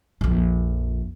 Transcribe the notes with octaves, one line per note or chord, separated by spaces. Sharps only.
A#1 F2